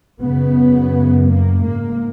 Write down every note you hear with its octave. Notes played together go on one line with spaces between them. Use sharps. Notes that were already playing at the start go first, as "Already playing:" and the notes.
F#2 C#3 B3
A#3
G#2 A#3